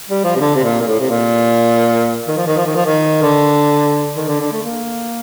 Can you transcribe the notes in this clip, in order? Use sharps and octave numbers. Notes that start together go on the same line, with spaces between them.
G3
F3
C3
D3
C3
A#2
A#2
A2
C3
A#2
D#3
F3
D#3
F3
D#3
F3
D#3
D3
D#3
D3
D3
A3
A#3